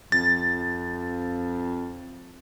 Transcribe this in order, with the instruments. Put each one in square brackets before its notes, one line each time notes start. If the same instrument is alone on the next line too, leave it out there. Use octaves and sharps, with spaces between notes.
[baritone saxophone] F2 [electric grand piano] A6